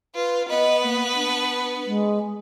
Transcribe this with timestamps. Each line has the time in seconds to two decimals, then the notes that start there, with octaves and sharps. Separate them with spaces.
0.15 F4 B4
0.49 B3 B4 D#5
0.83 A#3
1.15 D4
1.86 G#3